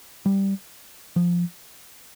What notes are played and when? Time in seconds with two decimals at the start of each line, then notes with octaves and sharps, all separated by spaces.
0.26 G3
1.16 F3